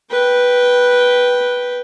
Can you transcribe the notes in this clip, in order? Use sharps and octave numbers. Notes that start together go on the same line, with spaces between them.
B4 G5